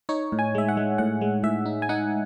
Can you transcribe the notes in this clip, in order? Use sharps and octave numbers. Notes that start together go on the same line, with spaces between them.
D#4 C#5
A2
G#5
G#3 E5
F#5
G#3
A2 F#5
G#3
A2 E5
D#4
G#5
D#4 F#5